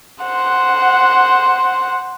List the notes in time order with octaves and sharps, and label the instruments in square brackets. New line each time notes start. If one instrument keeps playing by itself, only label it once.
[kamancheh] C5 F#5